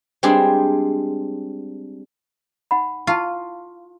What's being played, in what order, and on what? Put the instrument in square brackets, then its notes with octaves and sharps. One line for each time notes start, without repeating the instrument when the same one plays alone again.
[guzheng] G3 G#3 C4 D4 G4 G#4
[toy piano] D#4 F#5 B5
[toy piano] E4 A5 C#6 [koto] F4